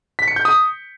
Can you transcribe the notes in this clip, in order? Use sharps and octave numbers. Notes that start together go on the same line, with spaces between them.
B6
C#7
G6
D#6